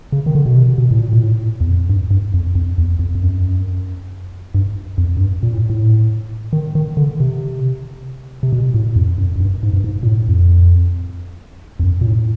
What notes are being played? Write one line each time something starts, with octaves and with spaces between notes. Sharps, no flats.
C#3
D#3
D3
B2
C3
B2
A2
A#2
A#2
A2
E2
F2
G2
G2
F2
F2
E2
F2
F2
F#2
G2
F2
F#2
G2
A#2
A2
A2
D#3
D#3
D3
C3
C3
B2
A2
F2
F#2
F#2
G2
G#2
G2
G#2
A#2
A2
F2
F2
F#2
A#2
A2